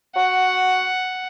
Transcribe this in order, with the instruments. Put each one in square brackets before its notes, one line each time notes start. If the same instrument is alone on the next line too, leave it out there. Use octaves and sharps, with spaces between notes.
[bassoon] F#4 [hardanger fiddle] F#5